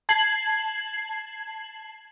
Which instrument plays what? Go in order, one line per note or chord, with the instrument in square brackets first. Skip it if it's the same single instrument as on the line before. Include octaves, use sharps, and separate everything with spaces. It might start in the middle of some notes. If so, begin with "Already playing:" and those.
[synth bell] A5 G#6 C7 F#7